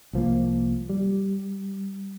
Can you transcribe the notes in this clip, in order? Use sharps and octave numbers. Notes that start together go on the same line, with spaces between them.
C2 F3 A#3
G3